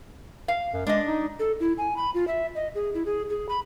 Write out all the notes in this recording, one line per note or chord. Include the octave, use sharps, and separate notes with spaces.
F5
F#2
G#3 D4 D#5
D#4
A4
E4
G#5
B5
F4
E5
D#5
G#4
E4
G#4
G#4
B5